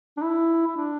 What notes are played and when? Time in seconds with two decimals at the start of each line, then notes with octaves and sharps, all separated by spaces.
0.17 D4
0.22 E4
0.67 E4
0.77 D4